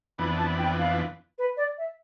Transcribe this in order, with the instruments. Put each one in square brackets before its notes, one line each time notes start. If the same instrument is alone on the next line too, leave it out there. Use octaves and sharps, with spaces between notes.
[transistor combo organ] F2 E3 B3 D4 [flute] B5
[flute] A5
G5
F5
B4
D5
E5